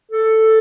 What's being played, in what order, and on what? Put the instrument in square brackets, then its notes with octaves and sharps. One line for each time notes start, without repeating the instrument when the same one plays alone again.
[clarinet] A4